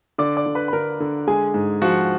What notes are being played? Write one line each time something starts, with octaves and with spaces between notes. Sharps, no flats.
D3 D5 D6
D5 D6
D3
B4 B5
B5
D3 A#4 A#5
D3
G#3 G#4 G#5
G#2
F3 F#4 F#5